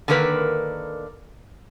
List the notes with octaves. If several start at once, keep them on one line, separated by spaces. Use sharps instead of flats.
D3 D#3 A#3 A#4 B4